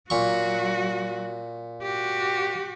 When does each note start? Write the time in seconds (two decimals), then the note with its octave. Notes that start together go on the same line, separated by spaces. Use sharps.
0.10 A#2 F#3 F#4 C#6
1.82 F#4 G4